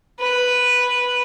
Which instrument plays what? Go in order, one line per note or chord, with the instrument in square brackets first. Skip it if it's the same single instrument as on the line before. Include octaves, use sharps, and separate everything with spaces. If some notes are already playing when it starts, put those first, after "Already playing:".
[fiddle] B4